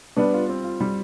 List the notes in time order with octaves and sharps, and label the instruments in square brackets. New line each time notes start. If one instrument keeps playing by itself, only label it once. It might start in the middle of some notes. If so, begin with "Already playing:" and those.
[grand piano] G3 [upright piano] B3 D4
[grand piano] F4
C4
F4
G3